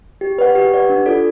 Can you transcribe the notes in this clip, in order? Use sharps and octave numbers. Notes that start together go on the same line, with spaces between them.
G4
B4 D5 F#5
G4
B4 D5 F#5
D4
F4 A4 D5